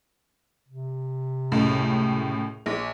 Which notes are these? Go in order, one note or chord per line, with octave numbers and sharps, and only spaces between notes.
C3
C#2 F#2 A2
A#1